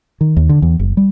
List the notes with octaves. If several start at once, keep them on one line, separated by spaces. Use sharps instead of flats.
D#3
D#2
D3
E2
F#1
G3